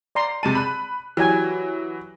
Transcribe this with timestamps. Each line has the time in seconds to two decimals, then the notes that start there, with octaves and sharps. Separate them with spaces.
0.15 D5 A#5 C6
0.43 C3 G#3 A5 D#7
0.55 B5 F#6
1.17 E3 F#3 G4 G#5